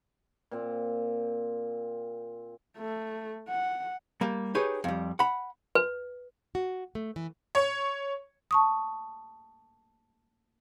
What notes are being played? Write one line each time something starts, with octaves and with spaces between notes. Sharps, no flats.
A#2 C4
A3
F#5
G3 A#3
D#4 G4 G#4 B4 C#5
F2 G3
F#5 B5
B4
F#4
A3
E3
C#5
A5 C#6 D#6